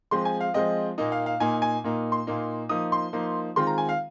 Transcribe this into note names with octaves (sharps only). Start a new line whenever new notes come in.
F3 G#3 C4 C6
G#5
F5
F3 G#3 C4 D#5
A#2 A#3 D#4 D#5
F5
F5
A#2 A#3 D#4 G#5
G#5
A#2 A#3 D#4
C6
A#2 A#3 D#4
F3 A#3 D#4 D#6
C6
F3 A#3 D#4
D#3 G#3 C4 F4 C6
A#5
G#5
F5